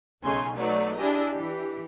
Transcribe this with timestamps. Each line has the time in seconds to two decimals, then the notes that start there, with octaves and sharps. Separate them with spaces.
0.22 B1 C#3 A3 D#4 G#5 C6
0.55 F#3 A3 D#4 B4 D5
0.96 D4 E4 G4 G#4 D#5
1.31 E3 G4